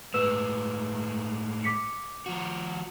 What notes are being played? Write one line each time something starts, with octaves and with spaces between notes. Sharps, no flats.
A2 G#3 B4 E6 E7
D6 B6 C#7
F3 F#4